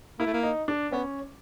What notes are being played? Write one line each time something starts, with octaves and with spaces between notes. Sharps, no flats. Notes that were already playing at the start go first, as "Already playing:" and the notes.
A#3 E4
A3
A#3
D#4
D4
B3 C#4